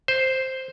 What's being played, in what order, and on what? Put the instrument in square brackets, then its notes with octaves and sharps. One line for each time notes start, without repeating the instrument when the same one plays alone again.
[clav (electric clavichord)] C5